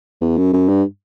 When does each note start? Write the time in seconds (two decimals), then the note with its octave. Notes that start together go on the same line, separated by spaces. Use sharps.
0.21 E2
0.37 F#2
0.53 F#2
0.69 G2